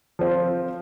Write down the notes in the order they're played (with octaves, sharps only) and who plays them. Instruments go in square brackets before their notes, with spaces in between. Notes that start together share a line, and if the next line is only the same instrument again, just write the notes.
[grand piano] F3 C4 F4